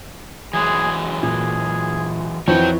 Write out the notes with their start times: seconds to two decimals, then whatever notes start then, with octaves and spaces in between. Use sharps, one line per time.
0.54 E3 F#3 G#3 G#4
1.23 A#2 G#4
2.48 F2 E3 F3 F#4 C#5 G5